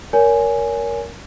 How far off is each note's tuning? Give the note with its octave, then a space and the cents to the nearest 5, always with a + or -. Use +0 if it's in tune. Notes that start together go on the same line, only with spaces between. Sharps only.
A#4 +5 C#5 +30 G#5 +0